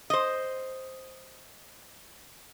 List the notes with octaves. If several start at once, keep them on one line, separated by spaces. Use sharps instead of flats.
C5 D#5